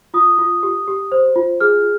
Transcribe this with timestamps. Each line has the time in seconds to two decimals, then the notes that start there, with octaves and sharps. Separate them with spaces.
0.14 F4 D#6
0.38 F4
0.63 G4
0.88 G4
1.12 C5
1.36 F4
1.60 G#4 F6